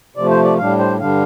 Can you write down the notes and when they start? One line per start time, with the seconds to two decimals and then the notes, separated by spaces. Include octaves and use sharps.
0.16 C3 F3 A3 D5
0.30 C5
0.44 D5
0.59 A2 G3 D4 F5
0.79 C5
0.99 G2 D3 G3 D4 F5